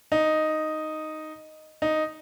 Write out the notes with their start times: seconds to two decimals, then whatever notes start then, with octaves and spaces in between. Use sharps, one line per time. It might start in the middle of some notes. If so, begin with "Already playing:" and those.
0.12 D#4
1.82 D#4